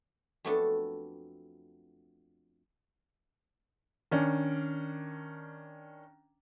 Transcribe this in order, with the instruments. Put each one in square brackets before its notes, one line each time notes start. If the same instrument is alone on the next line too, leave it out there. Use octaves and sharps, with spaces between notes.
[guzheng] F2 F#3 A3 B3 D4 A4
[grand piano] D#3 C#4 D4